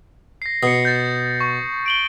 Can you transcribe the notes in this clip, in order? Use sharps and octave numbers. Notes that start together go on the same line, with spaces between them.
A#6 C7
B2 D#6 C7 C#7
G6 A6
C#6
D7 F#7 G7